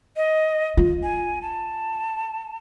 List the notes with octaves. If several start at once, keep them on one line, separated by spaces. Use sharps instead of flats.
D#5
F4
G#5
A5